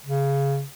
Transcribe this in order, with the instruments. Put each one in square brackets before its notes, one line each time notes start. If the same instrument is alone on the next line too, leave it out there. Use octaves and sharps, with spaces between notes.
[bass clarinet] C#3